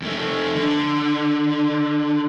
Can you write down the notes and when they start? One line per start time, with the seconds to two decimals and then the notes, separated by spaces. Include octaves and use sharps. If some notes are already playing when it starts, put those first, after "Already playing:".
0.02 F2 A3
0.55 D3